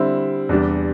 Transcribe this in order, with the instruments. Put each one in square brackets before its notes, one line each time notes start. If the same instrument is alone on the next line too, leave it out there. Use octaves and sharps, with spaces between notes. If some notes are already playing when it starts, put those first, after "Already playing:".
Already playing: [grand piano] D3 G3 C4 E4
E2 C3 G3 D4